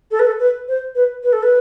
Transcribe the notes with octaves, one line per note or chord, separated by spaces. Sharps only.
A4
B4
A4
B4
C5
B4
B4
A4
B4